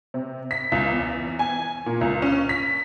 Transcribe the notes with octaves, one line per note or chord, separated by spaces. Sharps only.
C3
B6
C#2
E2
E2
G#5
A#2
C#2
C#4
B6